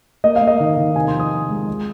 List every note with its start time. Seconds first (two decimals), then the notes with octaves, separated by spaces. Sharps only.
0.24 A#3 D#5
0.36 F5
0.41 A#3
0.47 D#5
0.60 D#3
0.77 D#3
0.95 C3 G#5
1.08 C6
1.14 F3
1.20 D#6
1.31 F3
1.50 G#3
1.67 G#3